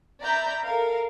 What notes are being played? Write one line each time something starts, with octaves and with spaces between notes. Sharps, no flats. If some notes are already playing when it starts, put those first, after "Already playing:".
D5 E5 A#5 B5 G6
A4 A#4 F5